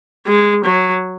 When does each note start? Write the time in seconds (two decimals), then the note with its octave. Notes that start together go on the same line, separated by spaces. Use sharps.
0.27 G#3
0.65 F#3